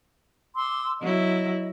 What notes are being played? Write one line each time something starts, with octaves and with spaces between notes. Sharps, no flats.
C6 D6 E6
F#3 E4 D#5